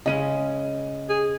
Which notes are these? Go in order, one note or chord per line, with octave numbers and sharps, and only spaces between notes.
C#3 G#3 C#4 D#5 D#7
G#4